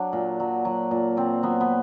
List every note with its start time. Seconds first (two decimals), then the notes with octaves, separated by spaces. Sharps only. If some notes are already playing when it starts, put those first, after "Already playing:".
Already playing: F#3 D4
0.13 A#2
0.40 F#3
0.65 F#3
0.91 A#2
1.17 A#2 C4
1.43 F#3 B3
1.61 B3